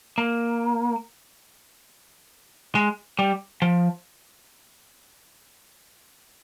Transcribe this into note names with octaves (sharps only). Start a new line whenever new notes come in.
A#3
G#3
G3
F3